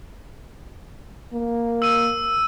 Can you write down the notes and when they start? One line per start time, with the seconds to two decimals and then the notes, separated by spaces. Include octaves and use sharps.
1.33 A#3
1.82 E6 D#7